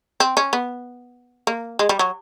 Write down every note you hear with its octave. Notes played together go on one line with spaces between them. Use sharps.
C4
C#4
B3
A#3
G#3
G3
F#3